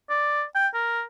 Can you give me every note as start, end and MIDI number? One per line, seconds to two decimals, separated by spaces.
0.10 0.44 74
0.55 0.67 79
0.74 1.02 70